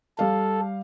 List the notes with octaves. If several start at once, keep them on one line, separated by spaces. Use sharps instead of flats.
G3 A4 F5